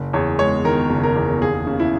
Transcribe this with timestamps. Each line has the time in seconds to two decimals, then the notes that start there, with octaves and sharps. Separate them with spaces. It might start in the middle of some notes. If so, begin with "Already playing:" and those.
Already playing: F#1
0.13 E2 C#5
0.39 G#3 C#5
0.64 D#3 A#4
0.90 F#1
1.03 A#4
1.16 E2
1.41 D#2 G#4
1.67 C#3
1.80 E4